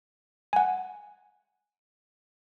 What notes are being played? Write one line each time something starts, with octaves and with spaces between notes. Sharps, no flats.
F#5 G#5